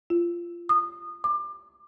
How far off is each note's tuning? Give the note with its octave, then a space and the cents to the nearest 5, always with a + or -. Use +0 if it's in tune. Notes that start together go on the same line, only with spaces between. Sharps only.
F4 -20
D#6 -25
D6 +30